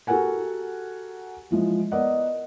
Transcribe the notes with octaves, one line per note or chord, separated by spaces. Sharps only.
F#4 G4 A4 A#4 F#5 G#5
E3 F3 G#3
B3 A#4 D5 D#5 F#5